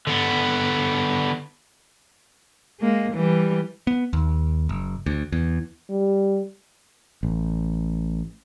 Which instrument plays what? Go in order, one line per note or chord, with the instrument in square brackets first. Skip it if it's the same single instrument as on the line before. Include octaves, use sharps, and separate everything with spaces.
[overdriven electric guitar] D3 B3
[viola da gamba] G#3 A#3
E3 G3
[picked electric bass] B3
D#2
F#1
D2
E2
[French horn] G3
[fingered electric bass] A1